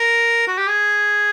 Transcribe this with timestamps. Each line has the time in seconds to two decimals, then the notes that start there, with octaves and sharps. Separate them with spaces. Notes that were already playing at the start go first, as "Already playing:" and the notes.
Already playing: A#4
0.48 F#4
0.58 G4
0.68 G#4